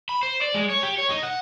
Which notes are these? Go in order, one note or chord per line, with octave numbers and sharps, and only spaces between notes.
B5
C5
D5
G#3
C#5
G4
C#5
D#4
F#5